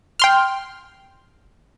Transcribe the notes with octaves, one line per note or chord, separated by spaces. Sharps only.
G5 C6 F6